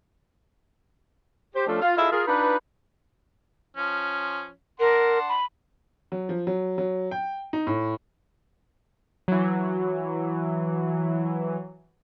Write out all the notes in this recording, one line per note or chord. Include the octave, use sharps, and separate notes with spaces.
G4 C5
F3 A3 C#4 D4 F4 A4
F4
E4 F4 G#4 A4 D#5 E5
F4 G#4 A#4
D4 D#4 F4 B4
F3 C#4
D4 A#4 F#5 C6
B5
F#3
F3
F#3
F#3
G5
D#4
A2
E3 F#3